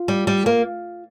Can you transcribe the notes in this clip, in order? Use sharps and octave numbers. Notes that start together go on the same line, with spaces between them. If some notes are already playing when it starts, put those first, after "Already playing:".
Already playing: F4
G3
G3
A#3